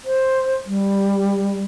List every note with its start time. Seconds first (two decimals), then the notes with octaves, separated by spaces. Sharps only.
0.05 C5
0.66 G3